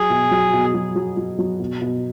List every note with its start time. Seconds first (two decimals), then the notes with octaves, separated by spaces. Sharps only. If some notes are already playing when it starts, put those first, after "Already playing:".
Already playing: F#3 G#4
0.10 B2
0.31 F#3
0.53 B2
0.74 F#3
0.96 F#3
1.17 F#3
1.39 F#3
1.60 B2
1.82 B2